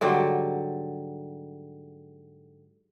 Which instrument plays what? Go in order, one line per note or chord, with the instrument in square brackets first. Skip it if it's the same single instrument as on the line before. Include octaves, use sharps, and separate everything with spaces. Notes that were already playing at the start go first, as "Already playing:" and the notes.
[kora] G#2 D3 F#3 G3